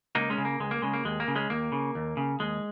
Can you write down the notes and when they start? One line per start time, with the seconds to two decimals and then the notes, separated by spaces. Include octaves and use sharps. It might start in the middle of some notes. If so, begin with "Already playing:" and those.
0.15 C#2 A#3 D#4
0.30 G#3 C#4
0.38 C#3
0.45 A#3
0.60 C#2 G#3
0.71 A#3
0.82 C#3 G#3
0.93 A#3
1.05 D#2 G#3
1.20 A#3
1.28 C#3
1.35 G#3 C#4
1.50 D#2 A#3
1.72 C#3
1.95 D#2
2.17 C#3
2.40 D#2 G#3